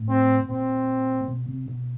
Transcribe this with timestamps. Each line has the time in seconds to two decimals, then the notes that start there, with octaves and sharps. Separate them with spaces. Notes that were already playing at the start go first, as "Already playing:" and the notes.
Already playing: A2
0.09 C4
0.49 A#2 C4
1.28 B2
1.48 C3
1.68 B2